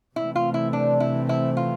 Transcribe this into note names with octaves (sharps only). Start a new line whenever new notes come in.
C3 E3 A3 C4 E4
F4
E4
D4
E4
E4
F4